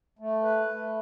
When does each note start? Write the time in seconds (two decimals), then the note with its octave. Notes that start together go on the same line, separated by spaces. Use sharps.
0.19 A3
0.43 B4
0.68 A3